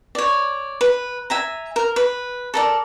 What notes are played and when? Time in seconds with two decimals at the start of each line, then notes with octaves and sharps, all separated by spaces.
0.15 C#5 D5
0.81 B4
1.30 E5 G#5 A#5
1.76 A#4
1.96 B4
2.54 A4 A#4 D5